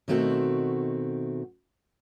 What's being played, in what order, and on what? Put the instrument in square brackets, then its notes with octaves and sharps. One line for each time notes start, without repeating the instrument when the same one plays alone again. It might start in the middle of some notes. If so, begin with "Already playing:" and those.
[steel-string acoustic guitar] B2 D#3 A3 C4 F#4